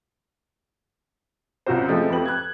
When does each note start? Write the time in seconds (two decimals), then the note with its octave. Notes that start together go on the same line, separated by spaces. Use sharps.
1.66 C2 F#2 F4 F#4 C5
1.88 F3 G#3 A3 C4
2.10 F2 G4 B4 F#7
2.26 F#6 G#6